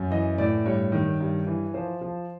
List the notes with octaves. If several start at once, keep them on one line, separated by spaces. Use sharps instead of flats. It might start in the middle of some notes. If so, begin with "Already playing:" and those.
Already playing: F#2
E3 D#5
A2 D5
G2 C#5
D#3
G2
E3
F3 C5
F3